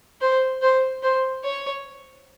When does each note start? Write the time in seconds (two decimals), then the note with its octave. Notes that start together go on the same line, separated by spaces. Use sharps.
0.21 C5
0.62 C5
1.03 C5
1.44 C#5